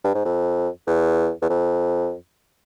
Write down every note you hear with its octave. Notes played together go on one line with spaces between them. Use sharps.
G2
G#2
F2
E2
E2
F2